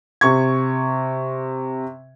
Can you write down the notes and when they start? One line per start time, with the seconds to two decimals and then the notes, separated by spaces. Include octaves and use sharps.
0.21 C3 C#6 G#6